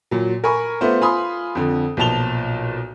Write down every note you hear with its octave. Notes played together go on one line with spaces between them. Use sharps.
A#2 F#3
A#4 G#5 B5 C#6
A3 B3 F4 C5
F4 G#5 B5 C6 D#6
F2 D3
B1 A#2 F3 A5 F7 G7